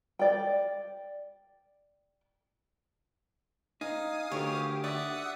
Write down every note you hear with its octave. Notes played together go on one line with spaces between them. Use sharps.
D5 G5
D#4 F5 G#5 D#6
D2 D3 D#3 G4 C#5
D5 E5 F#5 D#6